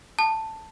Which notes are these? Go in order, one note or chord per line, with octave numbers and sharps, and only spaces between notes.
A5